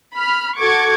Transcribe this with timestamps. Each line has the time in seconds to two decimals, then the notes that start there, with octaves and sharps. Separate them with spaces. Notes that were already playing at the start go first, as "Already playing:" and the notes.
0.15 B5 F6
0.59 F#4 A4 C#6 D6 G#6